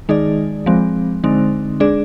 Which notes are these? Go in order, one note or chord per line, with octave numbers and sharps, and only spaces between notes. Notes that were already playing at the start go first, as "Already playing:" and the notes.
D#3 G#3 D#4 G#4 D5
F3 G#3 C4
D3 G#3 C4 D#4
G#3 D4 G#4 D5